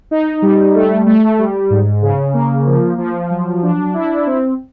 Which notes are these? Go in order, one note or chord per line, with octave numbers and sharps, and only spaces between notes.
D#4
G3
A3
A3
G3
G#2
C#3
A#3
F3
F3
F#3
D4
E4
C4